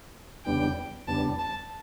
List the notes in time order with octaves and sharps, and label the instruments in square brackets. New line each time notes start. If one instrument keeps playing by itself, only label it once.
[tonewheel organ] E2 C#3 G3 B3 D4 [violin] G5
[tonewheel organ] E2 C#3 G3 B3 D4 [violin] A5
[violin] A5